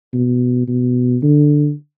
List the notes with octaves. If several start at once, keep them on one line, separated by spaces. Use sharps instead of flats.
B2
B2
D3